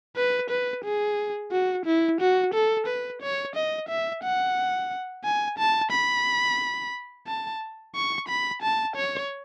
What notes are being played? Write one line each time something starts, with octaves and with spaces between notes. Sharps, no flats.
B4
B4
G#4
F#4
E4
F#4
A4
B4
C#5
D#5
E5
F#5
G#5
A5
B5
A5
C#6
B5
A5
C#5